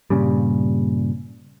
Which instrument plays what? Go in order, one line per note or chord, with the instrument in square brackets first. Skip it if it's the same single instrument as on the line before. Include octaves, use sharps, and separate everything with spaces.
[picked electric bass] G2 A#2 C#3 G3